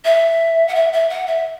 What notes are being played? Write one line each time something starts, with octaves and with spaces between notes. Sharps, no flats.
E5
F#5
E5
E5
F#5
E5